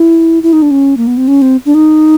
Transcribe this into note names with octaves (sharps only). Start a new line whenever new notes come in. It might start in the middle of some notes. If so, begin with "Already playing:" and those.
Already playing: E4
E4
D#4
D4
C#4
A#3
B3
C4
C#4
C4
D4
D#4